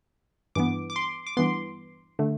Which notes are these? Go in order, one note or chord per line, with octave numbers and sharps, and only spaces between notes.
G2 E3 B3 D6
D6
C6
D6
G2 E3 B3 C6
D3 A3